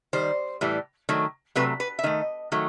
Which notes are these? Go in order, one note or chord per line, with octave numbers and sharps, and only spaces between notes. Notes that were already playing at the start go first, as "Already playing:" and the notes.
D#3 G3 C5
A2 E3 G3
D#3 F#3 A3
C3 F#3 A3 B4
B4
E5
D#3 A3 D#5
D#3 F#3 A3